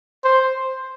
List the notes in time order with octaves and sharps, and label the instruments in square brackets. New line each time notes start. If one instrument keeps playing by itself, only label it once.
[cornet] C5